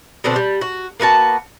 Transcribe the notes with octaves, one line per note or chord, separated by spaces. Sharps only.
B2 D3 C4 D4
G3
F#4
A#3 B3 F#4 A5